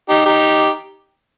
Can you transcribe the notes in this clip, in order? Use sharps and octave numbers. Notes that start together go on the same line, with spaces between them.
D#4 G4
D#4 G4